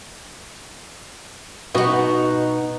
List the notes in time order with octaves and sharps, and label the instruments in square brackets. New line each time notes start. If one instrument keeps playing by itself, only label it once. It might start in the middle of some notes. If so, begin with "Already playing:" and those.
[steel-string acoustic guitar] B2 D#4 [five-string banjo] B3 F#4 B4